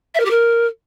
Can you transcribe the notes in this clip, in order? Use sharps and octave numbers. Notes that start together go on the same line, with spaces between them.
E5
A#4
G4
A#4